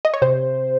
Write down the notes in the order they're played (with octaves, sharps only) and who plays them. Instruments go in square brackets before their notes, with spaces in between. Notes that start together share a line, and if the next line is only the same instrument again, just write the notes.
[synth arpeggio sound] D#5
C#5
C3 C5